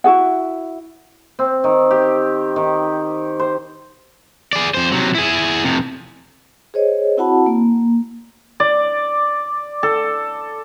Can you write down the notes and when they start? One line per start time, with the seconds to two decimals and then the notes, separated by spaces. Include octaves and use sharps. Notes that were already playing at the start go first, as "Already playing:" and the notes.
0.04 E4 F#4 G#4 F#5
1.39 C4
1.64 D#3
1.91 G4
2.56 D#3
3.40 C5
4.53 G#4 D5
4.74 F2 C5
4.92 C3 F#3
5.15 E4 G#4
5.64 F2 C3
6.74 G#4 C5 C#5 D#5
7.17 C4 E4 F#4 F#5 A5 B5
7.46 A#3
8.60 D5
9.83 A4